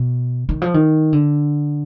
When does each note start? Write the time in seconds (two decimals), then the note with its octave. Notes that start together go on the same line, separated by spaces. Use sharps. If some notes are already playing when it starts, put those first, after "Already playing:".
Already playing: B2
0.49 D#3
0.62 F3
0.74 D#3
1.13 D3